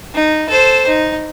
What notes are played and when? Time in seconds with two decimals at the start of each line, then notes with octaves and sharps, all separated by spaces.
0.14 D#4
0.49 A4 C5
0.87 D#4